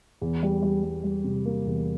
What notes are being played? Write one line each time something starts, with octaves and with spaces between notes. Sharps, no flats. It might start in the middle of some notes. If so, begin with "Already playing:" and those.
E2
G3
G3
G3
G3
C3
A#3
E2